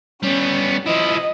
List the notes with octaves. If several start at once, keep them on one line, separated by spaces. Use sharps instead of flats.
G3 B3 C#4
F3 E4 D#5